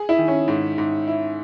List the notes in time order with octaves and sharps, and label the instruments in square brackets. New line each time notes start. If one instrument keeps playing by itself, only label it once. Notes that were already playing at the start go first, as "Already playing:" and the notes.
Already playing: [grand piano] G#4
[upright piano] E4
[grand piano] D#3
[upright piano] C#4
[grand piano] G#2
G#2
E4